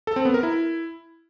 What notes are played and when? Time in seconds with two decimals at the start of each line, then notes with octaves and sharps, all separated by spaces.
0.07 A4
0.16 C4
0.25 B3
0.34 A#4
0.43 E4